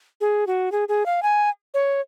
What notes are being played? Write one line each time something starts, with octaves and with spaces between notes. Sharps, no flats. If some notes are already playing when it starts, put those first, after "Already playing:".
G#4
F#4
G#4
G#4
F5
G#5
C#5